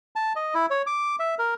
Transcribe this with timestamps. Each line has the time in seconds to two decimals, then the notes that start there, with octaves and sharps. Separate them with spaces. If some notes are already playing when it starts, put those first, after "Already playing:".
0.16 A5
0.36 D#5
0.54 E4
0.70 C#5
0.87 D6
1.19 E5
1.39 A#4